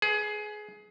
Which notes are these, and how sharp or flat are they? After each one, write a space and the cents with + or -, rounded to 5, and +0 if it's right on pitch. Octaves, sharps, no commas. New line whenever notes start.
G#4 +20 B4 +0